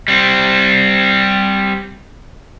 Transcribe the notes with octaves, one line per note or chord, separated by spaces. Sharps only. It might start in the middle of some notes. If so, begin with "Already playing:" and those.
G3 C4